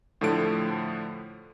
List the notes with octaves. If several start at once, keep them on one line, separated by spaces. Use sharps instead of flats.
A2 D3 F3 A3 D7